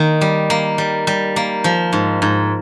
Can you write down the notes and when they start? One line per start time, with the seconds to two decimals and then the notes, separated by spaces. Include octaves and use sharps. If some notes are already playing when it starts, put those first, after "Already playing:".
Already playing: D#3 A#3
0.21 G3
0.50 A#3
0.78 G3
1.07 G3
1.36 A#3
1.64 F3
1.93 G#2
2.22 G#2